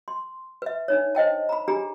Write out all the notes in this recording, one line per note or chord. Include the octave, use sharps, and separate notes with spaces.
C6
B4 E5
D4 D#4 C#5
C5 D#5 G5 A5
A#5 B5
D4 G4 G#4 A#5